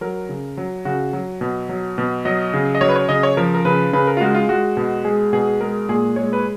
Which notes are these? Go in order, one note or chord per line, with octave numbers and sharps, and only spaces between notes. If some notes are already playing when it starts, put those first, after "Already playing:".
F#3 A#4
C#3
F#3
C#3 F#4
F#3
B2
F#3
B2
F#3 D#5
C#3
D#5
F#3 C#5
B4
C#5
C#3 D#5
C#5
F3 A#4
A#4
C#3 B4
C#3 B4
A#4
F4
G#3 F#4
F4
G#3 F#4
B2
G#3 G#4
B2 G#4
G#3 A#4
A#2 G#4
G#3 C#5
B4